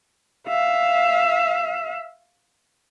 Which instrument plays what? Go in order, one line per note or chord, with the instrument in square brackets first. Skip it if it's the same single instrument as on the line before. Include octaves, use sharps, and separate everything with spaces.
[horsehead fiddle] E5 F5